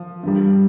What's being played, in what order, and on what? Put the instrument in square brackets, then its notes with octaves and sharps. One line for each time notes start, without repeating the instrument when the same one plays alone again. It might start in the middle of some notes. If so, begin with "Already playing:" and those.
Already playing: [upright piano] F3
G2 G3